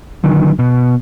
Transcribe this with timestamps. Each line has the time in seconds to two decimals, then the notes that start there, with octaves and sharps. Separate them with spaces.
0.24 D3 D#3 F#3
0.59 B2